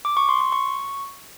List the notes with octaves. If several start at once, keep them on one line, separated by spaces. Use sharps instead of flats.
D6
C#6
C6
C6
C#6